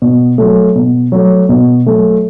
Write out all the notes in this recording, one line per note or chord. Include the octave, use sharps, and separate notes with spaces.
B2
F#3 A3
B2
F#3 A3
B2
F#3 A3